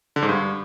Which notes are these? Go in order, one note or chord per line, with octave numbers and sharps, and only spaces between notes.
D3
G#2
G2